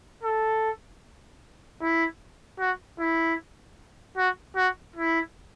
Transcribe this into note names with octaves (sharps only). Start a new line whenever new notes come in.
A4
E4
F#4
E4
F#4
F#4
E4